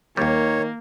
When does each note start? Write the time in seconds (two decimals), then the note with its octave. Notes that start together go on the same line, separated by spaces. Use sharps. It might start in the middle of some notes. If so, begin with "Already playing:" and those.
0.17 D#2 D#3 G3 A#3 C#5